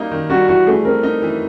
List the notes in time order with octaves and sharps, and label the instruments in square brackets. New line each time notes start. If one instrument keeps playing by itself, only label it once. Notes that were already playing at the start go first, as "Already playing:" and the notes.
Already playing: [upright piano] G3 A#3 D#4
D#3
[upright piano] G3 [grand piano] F#4
[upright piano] E3 [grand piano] F#4
[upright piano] A3 [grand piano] G#4
[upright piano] C4 [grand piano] A#4
[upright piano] D#4
E3